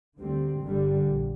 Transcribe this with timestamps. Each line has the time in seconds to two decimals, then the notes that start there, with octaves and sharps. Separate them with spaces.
0.18 D2 D3 G3 C4
0.61 G1 G2 D3 G3
1.05 A#1